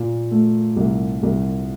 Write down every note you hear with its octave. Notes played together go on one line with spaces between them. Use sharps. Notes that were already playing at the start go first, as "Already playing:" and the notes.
Already playing: A#2
A3
C2
C2